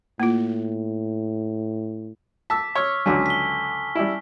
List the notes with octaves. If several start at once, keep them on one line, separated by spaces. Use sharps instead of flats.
A2 A#3 F4
A5 D6 E6 B6
C#5 C#6 E6 F6
C#2 D3 F#3 G#5 A5 B6
B6 G7
G3 E4